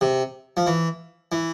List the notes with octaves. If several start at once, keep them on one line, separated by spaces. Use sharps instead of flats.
C3
F3
E3
E3